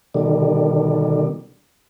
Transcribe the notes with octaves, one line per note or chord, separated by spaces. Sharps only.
B2 D3 D#3 G3